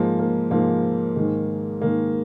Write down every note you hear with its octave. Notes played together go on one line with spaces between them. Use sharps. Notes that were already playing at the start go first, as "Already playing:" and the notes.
Already playing: G#2 F3 G#3 A#3
A#3
G#2 F3 G#3 A#3
G#2 D#3 G#3
G#2 D#3 G#3 A#3